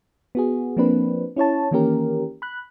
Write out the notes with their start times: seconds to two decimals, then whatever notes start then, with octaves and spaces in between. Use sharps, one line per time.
0.35 B3 F#4 G#4
0.77 F3 A#3 C4 D4 B4
1.36 C#4 E4 C#5 A5
1.71 D#3 E3 A#3 C#4 G4 A#4
2.42 B5 F#6